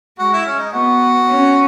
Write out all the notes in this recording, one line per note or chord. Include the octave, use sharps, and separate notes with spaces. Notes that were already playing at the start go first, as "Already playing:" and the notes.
G#3 F#4
E4
C#4
D#4
B3 F#4
C#4